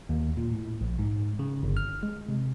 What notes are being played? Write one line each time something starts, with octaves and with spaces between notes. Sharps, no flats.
D#2
A#2
A2
A#1
G#2
C#3
G1
F6
G#3
C3